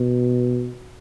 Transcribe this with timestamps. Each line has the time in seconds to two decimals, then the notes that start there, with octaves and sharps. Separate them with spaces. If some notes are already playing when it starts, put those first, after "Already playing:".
Already playing: B2